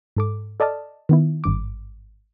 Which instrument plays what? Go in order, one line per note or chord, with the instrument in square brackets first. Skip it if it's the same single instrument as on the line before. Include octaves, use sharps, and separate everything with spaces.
[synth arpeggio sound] G#2 A4 D6
A4 D5 D#5 A5 F6
D#3 B3 E4
G#1 G2 D6